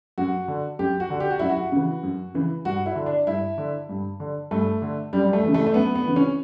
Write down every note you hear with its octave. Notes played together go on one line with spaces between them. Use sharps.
F#2 F#4
D3
F#2 G4
F#4
D3
G4
F#4
F#2 E4
F#4
C#3 E3
F#2
C#3 E3
G2 F#4
E4
D3
D4
G2 E4
D3
G2
D3
G2 A3
D3
F#2 G3
G3
A3
C#3 E3
A3
A3
F#2 B3
B3
C#3 E3
C#4